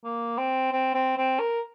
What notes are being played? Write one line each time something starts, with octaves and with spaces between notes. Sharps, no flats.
A#3
C4
C4
C4
C4
A#4